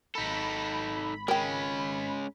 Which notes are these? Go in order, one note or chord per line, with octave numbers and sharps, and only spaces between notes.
G#1 D#4 A4 B5
G#3 C#4 A#4 G5